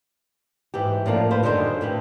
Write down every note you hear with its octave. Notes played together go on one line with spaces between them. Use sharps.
G#2 E3 G4
A2 F3 A#3 D4
F4 B4 C5
F#2 D3 D#3 G3 C5 D#5
A2 G4 B4